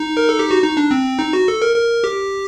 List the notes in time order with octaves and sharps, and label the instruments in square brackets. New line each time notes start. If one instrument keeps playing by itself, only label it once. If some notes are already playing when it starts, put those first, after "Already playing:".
Already playing: [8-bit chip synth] D#4
A#4
A4
G4
F#4
D#4
D4
C4
D#4
F#4
A4
A#4
A#4
G4